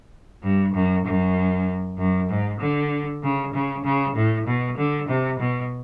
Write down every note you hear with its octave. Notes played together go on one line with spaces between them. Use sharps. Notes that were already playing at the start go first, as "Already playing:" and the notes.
G2
F#2
F#2
F#2
G#2
D3
C#3
C#3
C#3
A2
B2
D3
C3
B2